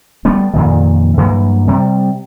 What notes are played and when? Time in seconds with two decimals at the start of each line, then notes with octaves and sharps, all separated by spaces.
0.25 G3 A3 B3
0.54 F2 A#2 D#3
1.17 G2 E3 F#3 A#3
1.68 C3 G3